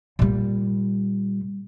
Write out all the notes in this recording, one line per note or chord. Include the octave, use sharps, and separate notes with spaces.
A#2 G3